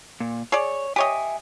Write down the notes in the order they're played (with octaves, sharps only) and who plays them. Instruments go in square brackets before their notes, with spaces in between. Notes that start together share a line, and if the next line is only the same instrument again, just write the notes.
[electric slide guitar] A#2
[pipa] G#4 D5 [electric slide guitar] C#5
[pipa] G4 C#5 D#5 [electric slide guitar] E5 G#5